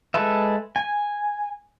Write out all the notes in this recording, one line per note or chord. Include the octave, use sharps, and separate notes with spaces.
G#3 A4 B4 E5
G#5